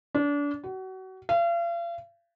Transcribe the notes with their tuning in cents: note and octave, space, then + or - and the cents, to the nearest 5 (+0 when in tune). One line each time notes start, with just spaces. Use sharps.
D4 -30
F#4 +30
F5 -40